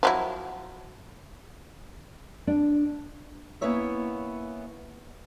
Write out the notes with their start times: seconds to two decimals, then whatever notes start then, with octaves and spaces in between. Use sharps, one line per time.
0.03 F3 F#3 E4
2.47 D4
3.61 A#3 B3 C#4 E4 C#5 E5